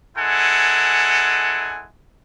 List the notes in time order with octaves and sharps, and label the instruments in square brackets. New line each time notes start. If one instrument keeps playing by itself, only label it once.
[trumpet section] G#3 C#4 E4 A4 F#5 G#5